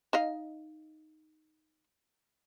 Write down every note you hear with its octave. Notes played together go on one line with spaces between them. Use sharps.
D#4 D#5 F5